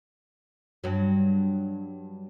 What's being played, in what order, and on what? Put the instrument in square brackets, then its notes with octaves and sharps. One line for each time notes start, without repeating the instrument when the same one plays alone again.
[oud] G2 F#3